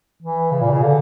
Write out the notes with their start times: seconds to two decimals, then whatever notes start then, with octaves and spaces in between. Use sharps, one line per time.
0.22 E3
0.52 C#3
0.61 A#2
0.70 C#3
0.82 D3